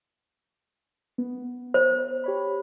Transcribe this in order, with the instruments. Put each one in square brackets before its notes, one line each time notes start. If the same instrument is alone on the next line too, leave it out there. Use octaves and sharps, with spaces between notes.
[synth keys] B3
[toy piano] C5
[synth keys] G4 C#5 B5